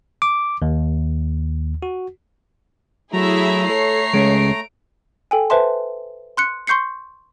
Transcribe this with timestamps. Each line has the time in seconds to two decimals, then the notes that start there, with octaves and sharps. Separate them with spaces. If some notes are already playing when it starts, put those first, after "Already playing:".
0.22 D6
0.62 D#2
1.83 F#4
3.13 F#3 A3 E4 G#4 E5 A#5
3.69 A4 C#5 C7
4.13 C#2 G#3 C#4 D7
5.31 A4 G5 G#5
5.50 B4 C5 E5 A5 C6
6.37 C6 F#6 C#7
6.67 C6 C#6 G6 C7 C#7